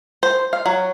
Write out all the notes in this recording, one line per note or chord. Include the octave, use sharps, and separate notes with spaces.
C5
F5
F#3